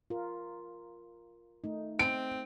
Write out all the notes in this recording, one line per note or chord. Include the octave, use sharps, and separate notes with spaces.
F4 A#4
A3 D#4
C4 D7